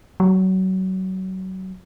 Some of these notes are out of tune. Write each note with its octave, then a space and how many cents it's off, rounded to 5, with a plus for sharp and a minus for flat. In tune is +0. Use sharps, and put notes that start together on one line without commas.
F#3 +25